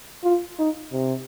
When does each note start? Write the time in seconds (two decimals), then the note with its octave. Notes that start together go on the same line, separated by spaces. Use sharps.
0.24 F4
0.59 D#4
0.92 C3